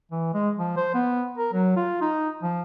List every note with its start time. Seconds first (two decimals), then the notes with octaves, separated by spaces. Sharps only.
0.11 E3
0.34 G#3
0.59 F3
0.77 C5
0.94 B3
1.38 A#4
1.53 F#3
1.76 F4
2.01 D#4
2.42 F3